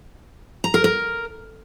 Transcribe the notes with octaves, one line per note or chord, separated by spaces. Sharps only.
A#5
A#4
A#4